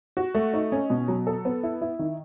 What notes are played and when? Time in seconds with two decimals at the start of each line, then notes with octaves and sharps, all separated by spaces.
0.17 F#4
0.35 A3
0.54 D#4
0.72 C#4
0.90 B2
1.08 F#3
1.27 A4
1.45 B3
1.63 E4
1.81 E4
1.99 D#3